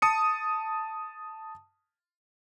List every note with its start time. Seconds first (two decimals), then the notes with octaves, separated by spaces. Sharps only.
0.02 A5 D#6 C#7